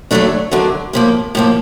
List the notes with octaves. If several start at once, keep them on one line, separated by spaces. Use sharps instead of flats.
D#2 D3 F#3 A3 D4
D#2 D3 F#3 A3 D4
A2 F3 A#3
A2 F3 A#3